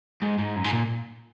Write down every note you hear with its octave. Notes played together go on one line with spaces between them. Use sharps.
G#2
G#2
F#2
G#2
A#2